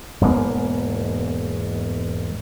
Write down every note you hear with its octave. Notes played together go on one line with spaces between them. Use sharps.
E1 G#2 A#3 B3